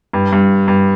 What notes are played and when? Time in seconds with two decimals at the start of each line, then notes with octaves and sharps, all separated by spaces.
0.13 G2
0.32 G2
0.68 G2